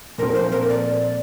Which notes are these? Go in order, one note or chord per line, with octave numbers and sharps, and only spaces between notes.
A#2 F3 A3 C4 A#4
C5
A#4
D5